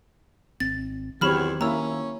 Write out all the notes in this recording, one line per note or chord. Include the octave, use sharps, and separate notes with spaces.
G#1 C4 A6
E2 D#3 F#3 C4 G4 C#5 B5 F6
A#3 C#4 E4 A#5 E6